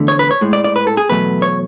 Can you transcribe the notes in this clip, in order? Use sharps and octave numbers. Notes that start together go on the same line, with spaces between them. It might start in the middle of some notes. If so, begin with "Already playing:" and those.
Already playing: E2 D3 A3
C#5
B4
C#5
A2 G#3
D5
D5
B4
A4
G#4
E2 B2 F#3 A3 B4
C#5